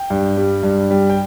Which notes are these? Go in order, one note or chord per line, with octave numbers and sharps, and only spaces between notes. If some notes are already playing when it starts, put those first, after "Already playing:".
Already playing: G5
G2
G3
G2
G3
G5